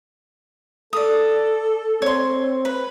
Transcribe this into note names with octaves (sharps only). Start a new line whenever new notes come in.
A4 D5 D#6
C4 C#5 C6
B4